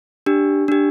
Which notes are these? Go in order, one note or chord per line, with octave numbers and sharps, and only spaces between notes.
D4 G4
D4 G4